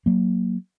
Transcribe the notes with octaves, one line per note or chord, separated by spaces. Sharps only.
F#3 A#3